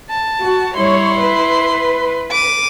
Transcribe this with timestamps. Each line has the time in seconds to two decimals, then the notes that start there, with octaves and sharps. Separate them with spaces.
0.10 A5
0.43 F#4
0.76 G3 E4 C#5 C6
1.22 B4
2.31 D6 D#7